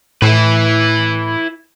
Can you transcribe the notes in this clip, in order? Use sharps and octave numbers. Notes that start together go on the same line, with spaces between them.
A2 E4 B4